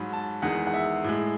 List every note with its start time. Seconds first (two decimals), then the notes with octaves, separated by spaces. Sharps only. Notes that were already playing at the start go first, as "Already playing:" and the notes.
Already playing: G#2 F#3 B5
0.13 A5
0.42 E2 D#3 G#3 F#5
0.67 F#5
0.74 E5
1.04 A2 G#3